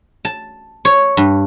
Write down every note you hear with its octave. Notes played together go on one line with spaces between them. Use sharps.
A5
C#5
G2